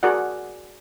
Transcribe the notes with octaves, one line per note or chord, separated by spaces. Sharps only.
F#4 G#4 A#4 D5 F#5